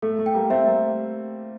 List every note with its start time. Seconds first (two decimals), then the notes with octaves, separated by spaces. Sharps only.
0.02 A3 A4
0.19 A3
0.26 G5
0.34 G3 A#3
0.50 A3 C4 E5
0.66 G3 A#3